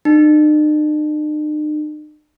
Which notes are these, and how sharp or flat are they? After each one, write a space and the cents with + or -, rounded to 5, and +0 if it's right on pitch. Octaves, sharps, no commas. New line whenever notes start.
D#4 -45